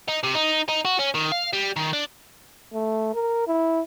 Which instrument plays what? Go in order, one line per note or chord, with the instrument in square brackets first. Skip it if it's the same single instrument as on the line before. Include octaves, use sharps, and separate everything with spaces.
[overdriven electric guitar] D#4
C3
D#4
D#4
F#4
C#4
D#3
F5
G3
D#3
D4
[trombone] A3
A#4
E4